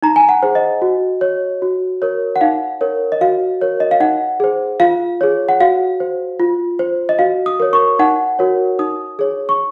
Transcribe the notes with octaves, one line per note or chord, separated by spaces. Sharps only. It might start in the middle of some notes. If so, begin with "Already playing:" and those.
D#4 A#5
G#5
F#5
G#4 C5
D#5
F#4
C#5
F#4
A#4 C#5
F#5
D#4 F5
A#4 C#5
D#5
F#4 F5
A#4 C#5
D#5
F5
D#4 F#5
G#4 C5
F4 F5
G#4 C#5
F#5
F#4 F5
C5
F4
C5
D#5
F#4 F5
D#6
A#4 C#5
C#6
D#4 F#5
F#4 A#4 C#5
D#4 D#6
G#4 C#5
C#6